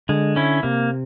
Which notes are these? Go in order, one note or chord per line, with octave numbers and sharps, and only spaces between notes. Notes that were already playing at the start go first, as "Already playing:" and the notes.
D3 G#3
C#4 E4
C3 A#3